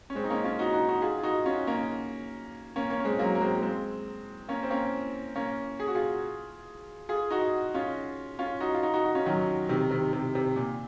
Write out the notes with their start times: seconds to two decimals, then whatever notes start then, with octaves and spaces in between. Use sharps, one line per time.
0.10 C#4
0.15 G#3 C4
0.24 D#4
0.30 A#3 C#4
0.44 C#4 F4
0.59 D#4 F#4
0.73 D#4 F#4
0.88 D#4 F#4
1.02 F4 G#4
1.19 F4
1.23 D#4 F#4
1.45 C#4 F4
1.67 A#3 C#4
2.76 A#3 C#4
2.90 A#3 C#4
3.00 C#4
3.05 G#3 C4
3.19 F#3 A#3
3.35 A#3
3.40 G#3 C4
3.62 G#3 C4
4.49 A#3 C#4
4.63 C4
4.71 A#3 C#4
5.36 A#3 C#4
5.80 G#4
5.88 F#4
5.95 F4 G#4
7.09 F4 G#4
7.31 D#4 F#4
7.74 C#4 F4
8.39 C#4 F4
8.60 D#4 F#4
8.75 F4
8.83 D#4 F#4
8.93 D#4 F#4
9.04 D#4 F#4
9.15 C#4 F4
9.26 D#3 F#3
9.69 C3 D#3
9.91 C3 D#3
10.13 C3
10.35 C3
10.56 A#2